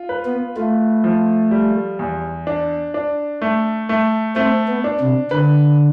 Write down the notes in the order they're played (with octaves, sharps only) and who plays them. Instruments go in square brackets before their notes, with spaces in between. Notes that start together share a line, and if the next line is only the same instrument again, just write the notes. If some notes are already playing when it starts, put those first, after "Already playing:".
Already playing: [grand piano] F4
B4
[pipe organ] B3
[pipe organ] A3 [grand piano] F4
[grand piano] F3
G3
E2
D4
D4
A3
A3
[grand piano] A3 [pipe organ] C4
[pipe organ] B3
[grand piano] D4
[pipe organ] C3
[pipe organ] D3 [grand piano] B4